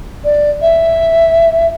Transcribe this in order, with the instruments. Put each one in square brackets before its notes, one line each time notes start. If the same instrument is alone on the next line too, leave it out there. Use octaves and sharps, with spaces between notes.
[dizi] D5
E5